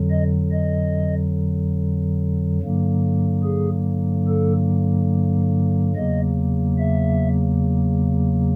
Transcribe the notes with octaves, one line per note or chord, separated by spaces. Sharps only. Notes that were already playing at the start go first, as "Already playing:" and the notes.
Already playing: F2 D3 F#3
D#5
D#5
G2 D3 F#3 A#3
G#4
A4
E2 C#3 F#3 A#3 D#5
E5